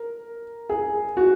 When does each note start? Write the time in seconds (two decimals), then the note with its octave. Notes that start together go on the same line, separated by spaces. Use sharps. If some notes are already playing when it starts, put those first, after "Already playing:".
Already playing: A#4
0.69 G#4
1.17 F#4